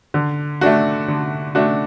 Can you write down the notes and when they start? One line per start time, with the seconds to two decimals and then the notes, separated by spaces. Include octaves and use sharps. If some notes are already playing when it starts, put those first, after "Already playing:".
0.14 D3
0.61 A3 D4 F#4
1.08 D3
1.55 A3 D4 F#4